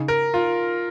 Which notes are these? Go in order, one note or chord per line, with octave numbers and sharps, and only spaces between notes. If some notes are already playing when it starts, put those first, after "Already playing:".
Already playing: C#3 D#4
A#4
F4